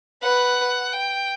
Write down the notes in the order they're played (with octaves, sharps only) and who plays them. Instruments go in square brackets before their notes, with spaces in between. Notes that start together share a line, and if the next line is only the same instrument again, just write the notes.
[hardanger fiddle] B4 [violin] F#5
[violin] G5